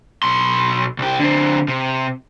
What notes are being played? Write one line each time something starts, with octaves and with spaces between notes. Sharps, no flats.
B1 C6
C2 G4
D3 C4
C3